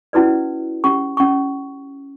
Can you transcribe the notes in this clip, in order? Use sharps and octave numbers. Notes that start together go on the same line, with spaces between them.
C#4 E4 F#4 B4 D5
C#4 G4 C#6
C#4 C#6